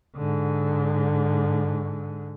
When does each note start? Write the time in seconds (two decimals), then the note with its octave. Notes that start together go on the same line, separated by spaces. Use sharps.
0.17 G#2 D3